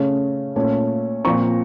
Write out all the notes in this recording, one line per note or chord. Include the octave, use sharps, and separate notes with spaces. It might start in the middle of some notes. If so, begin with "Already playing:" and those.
Already playing: C#3 A3 C#4
A#2 A3 C#4
A#2 F3 C4 A#5 C#6